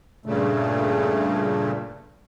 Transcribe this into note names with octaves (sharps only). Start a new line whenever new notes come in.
G2 A#2 C#3 A3